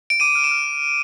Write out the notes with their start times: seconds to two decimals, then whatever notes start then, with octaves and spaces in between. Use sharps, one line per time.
0.10 D7
0.20 D6 D#7
0.35 F6
0.44 E7
0.51 F6